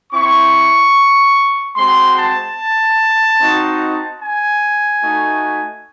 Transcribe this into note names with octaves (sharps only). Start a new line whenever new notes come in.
C4 E4 C#6
G#3 C4 F#4 C6
A5
C4 D#4 F#4
G#5
A3 D#4 F#4